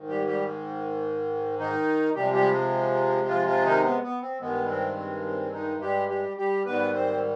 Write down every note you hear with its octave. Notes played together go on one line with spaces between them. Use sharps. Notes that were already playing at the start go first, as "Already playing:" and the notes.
Already playing: G#2 D#3
G3 G4
G3 G4
D#3 D#4
C3 F3 G3 G#3 G4
G3 G4
F3 F4
F3 F4
D#3 D#4
B3
B3
C4
G2 D#3 G#3 B3
C4
C4
C4
D#3 D#4
G3 G4
G3 G4
G3 G4
G#2 D#3 G3 B3 B4
C4 C5